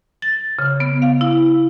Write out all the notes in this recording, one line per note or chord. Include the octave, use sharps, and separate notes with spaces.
A6
C#3
B3
F5
E4